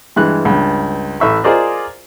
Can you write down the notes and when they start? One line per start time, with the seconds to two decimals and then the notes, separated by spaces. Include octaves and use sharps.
0.16 G2 E3 G#3 F#6
0.45 C#2 G2
1.20 A1 E5 C#6
1.44 F4 G#4 A#4 C5 D5 D#5